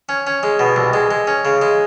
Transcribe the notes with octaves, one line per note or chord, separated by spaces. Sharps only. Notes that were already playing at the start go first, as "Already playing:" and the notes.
C#4
C#4
G#3
B2
C2
G#3
G#3
C#4
C#3
G#3